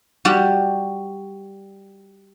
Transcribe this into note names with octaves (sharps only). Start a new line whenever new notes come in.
G3 F#4 G4